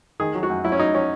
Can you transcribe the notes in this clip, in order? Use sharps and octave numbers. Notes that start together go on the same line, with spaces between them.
D#3 G#4
F#3
F#4
F#2
F#3 E4
C#4
F#3 D#4
F#3 C#4